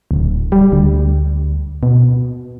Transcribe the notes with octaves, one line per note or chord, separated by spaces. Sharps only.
D1
G3
D2
B2